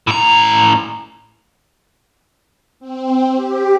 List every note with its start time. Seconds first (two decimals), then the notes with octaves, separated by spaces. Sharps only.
0.07 A2 A#5
2.80 C4
3.35 G4